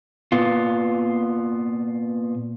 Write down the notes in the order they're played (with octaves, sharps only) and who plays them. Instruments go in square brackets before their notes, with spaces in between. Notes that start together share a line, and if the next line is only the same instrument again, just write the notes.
[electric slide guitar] A#2 B3 F4